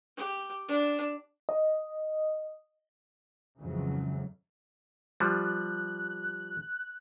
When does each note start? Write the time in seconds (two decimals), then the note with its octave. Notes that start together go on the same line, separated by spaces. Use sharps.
0.17 G4
0.68 D4
1.49 D#5
3.59 F2 G#2 C#3 E3 F#3
5.20 F3 G3 F#6